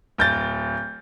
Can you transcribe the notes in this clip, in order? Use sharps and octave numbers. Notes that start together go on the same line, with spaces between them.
D1 G6 A6